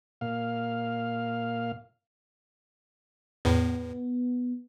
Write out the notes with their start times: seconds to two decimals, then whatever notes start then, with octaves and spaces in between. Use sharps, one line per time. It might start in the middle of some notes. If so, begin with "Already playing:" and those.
0.21 A#2 F5
3.45 E2 A2 B3